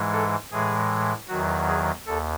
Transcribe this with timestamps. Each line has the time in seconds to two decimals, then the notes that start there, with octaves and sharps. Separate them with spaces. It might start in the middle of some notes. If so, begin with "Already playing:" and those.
Already playing: G#2 E3 G#3
0.13 A4
0.51 A2 E3 G#3 G#4
1.28 E2 D#3 F#3 F#4
1.67 G#4
2.07 D#2 A4